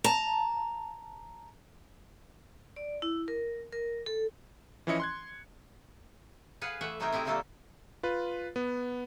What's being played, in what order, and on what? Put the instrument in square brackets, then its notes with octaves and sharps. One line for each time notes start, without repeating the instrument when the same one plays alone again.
[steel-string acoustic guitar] A5 A#5
[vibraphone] D5
E4
A#4
A#4
A4
[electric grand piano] E3 F3 C#4 E4 D#5 C#7
C6 F#6 G#6
[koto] G#4 B4 F5 F#5
E3 A3 E5 F#5
C3 A3 D#4 G#4 A#4 G5
C4 E4 G4 G#4 G5
A#2 D3 G3 A3 A#3 A4
[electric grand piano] F4 B4
B3